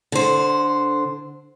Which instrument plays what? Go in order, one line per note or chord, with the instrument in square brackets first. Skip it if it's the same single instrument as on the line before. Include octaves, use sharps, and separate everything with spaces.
[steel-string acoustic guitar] D3 C5